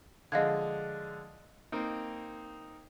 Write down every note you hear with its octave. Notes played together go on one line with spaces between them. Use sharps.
D3 F3 G#3 D#5 F5 G#6
A#3 C4 D#4